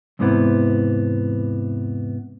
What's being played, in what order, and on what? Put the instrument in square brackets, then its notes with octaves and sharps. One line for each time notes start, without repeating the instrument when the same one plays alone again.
[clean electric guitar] E2 G#2 C3 E3 B3